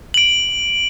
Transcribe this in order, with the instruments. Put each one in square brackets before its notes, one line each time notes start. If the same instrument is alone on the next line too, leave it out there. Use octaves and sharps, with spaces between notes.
[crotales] D7 F#7